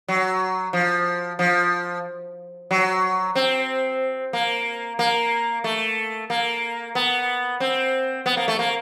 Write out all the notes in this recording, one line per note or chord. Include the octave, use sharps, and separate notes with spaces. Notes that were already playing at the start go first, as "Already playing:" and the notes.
F#3
F3
F3
F#3
C4
A#3
A#3
A3
A#3
B3
C4
B3
A#3
A3
A#3